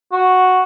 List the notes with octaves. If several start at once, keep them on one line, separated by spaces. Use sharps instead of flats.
F#4